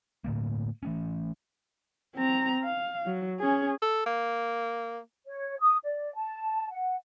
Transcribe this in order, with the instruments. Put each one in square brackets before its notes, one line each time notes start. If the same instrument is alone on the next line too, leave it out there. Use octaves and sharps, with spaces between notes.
[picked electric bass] A2 D3 A3 A#3
E3 A3 C#4
[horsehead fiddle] C4 A#5
F5
F#3
C#4 G#4
[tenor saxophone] A4
A#3
[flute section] C#5
D#6
D5
A5
F#5